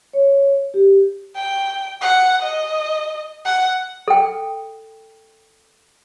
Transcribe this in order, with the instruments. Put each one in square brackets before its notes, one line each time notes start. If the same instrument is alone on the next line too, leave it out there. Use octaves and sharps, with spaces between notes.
[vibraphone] C#5
G4
[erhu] G5
F#5
D#5
F#5
[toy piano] A4 G5